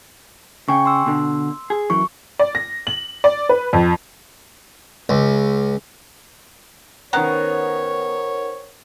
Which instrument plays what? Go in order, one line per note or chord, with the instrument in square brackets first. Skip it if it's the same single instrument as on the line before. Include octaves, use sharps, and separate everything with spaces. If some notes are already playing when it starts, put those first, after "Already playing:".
[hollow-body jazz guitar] C#3 [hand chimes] G5 G#5 C#6
[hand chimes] C6 E6
[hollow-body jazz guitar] B2 D3
G#4
[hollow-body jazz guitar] F#2 E3 [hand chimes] C#6
[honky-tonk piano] D5
A#6
F#7
D5
B4
F2
[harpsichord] C#2
[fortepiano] D#3 C#4 A#5 [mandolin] B3 [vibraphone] A#4 C5 F#5 [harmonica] C#5